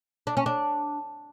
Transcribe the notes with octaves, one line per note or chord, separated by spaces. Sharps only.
D4
C#4
D4